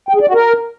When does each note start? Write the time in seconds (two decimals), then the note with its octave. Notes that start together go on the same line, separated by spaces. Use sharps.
0.09 G5
0.15 G#4
0.22 D5
0.28 F#4
0.34 A#4